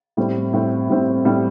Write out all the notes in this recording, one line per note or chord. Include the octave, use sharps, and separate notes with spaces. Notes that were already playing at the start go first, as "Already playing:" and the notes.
A2 G3 C4
A2 G3 C4
A2 G3 C4
A2 G3 C4